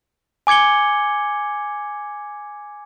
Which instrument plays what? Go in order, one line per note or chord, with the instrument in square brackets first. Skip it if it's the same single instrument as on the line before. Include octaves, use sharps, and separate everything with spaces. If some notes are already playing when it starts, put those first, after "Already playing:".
[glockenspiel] G#5 D6 G#6 C#7 G7